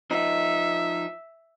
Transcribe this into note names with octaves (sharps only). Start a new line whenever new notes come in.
F3 D#4 E5